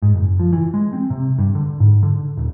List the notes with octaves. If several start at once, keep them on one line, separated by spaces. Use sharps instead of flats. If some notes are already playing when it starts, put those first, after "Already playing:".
G#2
F#1
F3
E3
G#3
C4
C3
G2
D3
G#2
D3
D#1